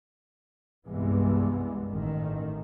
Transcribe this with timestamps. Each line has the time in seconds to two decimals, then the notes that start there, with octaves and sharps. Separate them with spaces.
0.85 C2 G2 E3 G#3 B3
1.88 A1 D#3